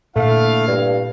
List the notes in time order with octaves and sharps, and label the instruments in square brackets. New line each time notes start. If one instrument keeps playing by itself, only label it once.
[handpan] A#2 [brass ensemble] D3 E4 F5 [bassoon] A3
[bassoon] G2